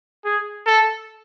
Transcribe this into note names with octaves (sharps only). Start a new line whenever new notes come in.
G#4
A4